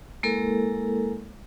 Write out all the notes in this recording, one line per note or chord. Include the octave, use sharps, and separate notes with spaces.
G#3 A#3 E4 A4 A#4